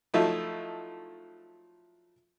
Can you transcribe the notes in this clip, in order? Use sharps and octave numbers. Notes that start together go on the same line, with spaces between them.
F3 F#3 A3 D#4 E4